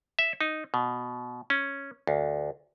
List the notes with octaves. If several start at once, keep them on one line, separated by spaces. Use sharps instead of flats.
E5
D#4
B2
C#4
D2